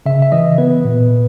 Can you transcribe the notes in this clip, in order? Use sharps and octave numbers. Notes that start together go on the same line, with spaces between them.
C#3 E5
E5
E3 D#5
B3 B4
A#2
A#2